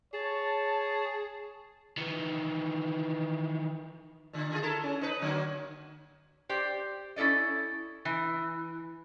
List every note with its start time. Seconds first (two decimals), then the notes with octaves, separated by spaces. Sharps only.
0.14 G#4 C#5 A5
1.98 D#3 E3
4.33 A#2 D3
4.51 D3 F4 G#4
4.62 E4 A4 A#4
4.83 C#4
5.01 D#4 B4
5.21 D3 F#3 A#3
6.49 G4 C5 D5
7.16 C#4 E4 A4 D5 D#5
8.05 E3